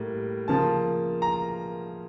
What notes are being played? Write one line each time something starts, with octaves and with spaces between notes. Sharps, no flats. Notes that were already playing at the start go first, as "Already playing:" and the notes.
Already playing: A2 G3 A#3
C#3 F3 A#3 A5
A#5